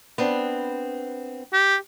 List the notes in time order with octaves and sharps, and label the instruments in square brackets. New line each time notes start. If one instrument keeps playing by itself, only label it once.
[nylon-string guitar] B3 C4 D4
[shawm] G4